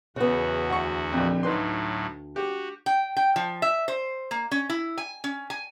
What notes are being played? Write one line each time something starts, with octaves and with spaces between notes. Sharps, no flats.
E2 C#3 B3 F#4
D2 F#5 C#6
A#1 F2
A2 F#3 D#4 B4 C6
F#4 G4
G5
G5
F3
E5
C5
A#3
C#4
E4
G#5
C#4
G#5